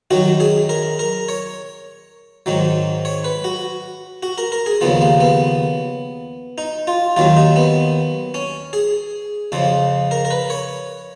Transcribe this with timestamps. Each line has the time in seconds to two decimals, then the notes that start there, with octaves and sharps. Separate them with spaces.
0.11 F#2 D#3 F#3 F#4
0.40 G#4
0.69 A#4
0.99 A#4
1.29 C#5
2.46 G#2 D#3 F#3
3.05 C#5
3.24 B4
3.44 F#4
4.23 F#4
4.38 A#4
4.52 A#4
4.66 G#4
4.81 D#2 C#3 F3 B3
5.01 A#3
5.20 B3
6.58 D#4
6.87 F4
7.16 D#2 D#3 F#3 F4
7.37 D#4
7.56 B3
8.34 C#4
8.73 G#4
9.52 F2 C#3 F3
10.11 A#4
10.25 A#4
10.31 B4
10.50 C#5